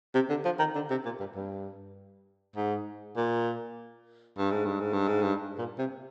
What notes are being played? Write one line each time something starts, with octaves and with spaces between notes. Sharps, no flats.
C3
D3
F3
D#3
D3
C3
A#2
G2
G2
G#2
A#2
G2
G#2
G2
G#2
G2
G#2
G2
A#2
C3